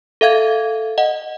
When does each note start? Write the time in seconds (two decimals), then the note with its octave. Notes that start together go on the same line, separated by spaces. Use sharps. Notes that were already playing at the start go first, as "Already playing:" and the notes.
0.21 A4 E5 F5 G#6
0.98 D#5 F#5